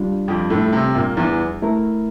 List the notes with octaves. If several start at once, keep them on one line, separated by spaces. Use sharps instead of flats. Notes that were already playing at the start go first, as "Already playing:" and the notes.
Already playing: G3 D4 F4
F2 F3
A2 A3
C3 C4
A#2 A#3
E2 E3
A3 E4 A#4